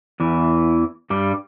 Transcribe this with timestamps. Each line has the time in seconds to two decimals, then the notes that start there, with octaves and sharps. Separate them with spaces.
0.20 E2 E3
1.10 G2 G3